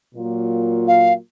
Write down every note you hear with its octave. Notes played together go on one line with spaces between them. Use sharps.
A#2 F#3 A#3 F4
F5